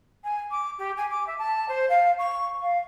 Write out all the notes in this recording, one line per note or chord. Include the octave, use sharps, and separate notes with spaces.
G#5
D6
G4
G#5
D6
E5
A5
C5
F5
C#6
F5